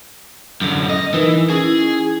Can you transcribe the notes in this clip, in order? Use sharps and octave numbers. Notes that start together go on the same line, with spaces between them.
F#2 D3
D#5
E3 D#4 A#4 B4
C#4 E4 G#4